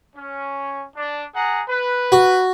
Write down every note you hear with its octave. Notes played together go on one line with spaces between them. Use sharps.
C#4
D4
G#4 F#5 A#5
B4
F#4